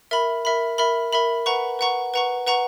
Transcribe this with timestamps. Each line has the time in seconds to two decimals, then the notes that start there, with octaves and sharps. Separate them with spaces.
0.11 A#4 E5 B5
0.45 A#4 E5 B5
0.78 A#4 E5 B5
1.13 A#4 E5 B5
1.46 B4 F#5 A#5 C#6
1.79 B4 F#5 A#5 C#6
2.14 B4 F#5 A#5 C#6
2.47 B4 F#5 A#5 C#6